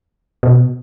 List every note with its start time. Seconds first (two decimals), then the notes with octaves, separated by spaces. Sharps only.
0.43 B2